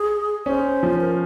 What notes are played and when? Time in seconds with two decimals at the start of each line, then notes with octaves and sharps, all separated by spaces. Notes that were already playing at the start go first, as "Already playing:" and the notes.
Already playing: G#4
0.46 C#4 C5
0.83 F3
1.01 A#4